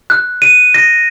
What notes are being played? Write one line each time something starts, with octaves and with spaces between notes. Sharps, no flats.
F#6
D#7
A#6